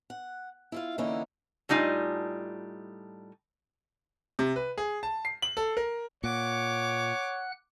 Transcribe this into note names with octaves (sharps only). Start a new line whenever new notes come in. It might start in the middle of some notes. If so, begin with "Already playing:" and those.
F#5
E4 F4 F5
D3 E3 A#3 C#4 D#4 E4
A2 G3 D#4 F4 G#5
C3
B4
G#4
A5
C7
F#7
A4
A#4
A#2 C#5 F#5 D6 F#6